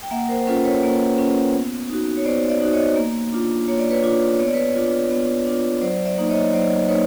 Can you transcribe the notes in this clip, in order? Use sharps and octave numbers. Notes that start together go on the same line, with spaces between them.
G5
A#3 E5 F#5
A#4 C5
C5
C#4 F4 A4 B4
B4 C#5
A#3
C#4 F4
B3
D#4 F#4
C#5
B3 C5 D5
D5 E5
D#4 F#4
C#5 D#5
A#3
D4 F4
A#3 C#5
D5
B4 C#5
D4 F4
B3 C#5
D5
B4 C#5
D4 F4
B3
D4 F4
F#3 C5 D5
D5 E5
A#3 D#4
C#5 D#5
F#3 C5 D5
A#3 D#4 B4 C#5